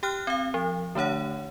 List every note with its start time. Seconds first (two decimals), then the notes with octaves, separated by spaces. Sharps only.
0.03 G4 G5 F6 F#6
0.27 C4 F5
0.54 F3
0.95 D3 A3 D4 C#5 F#5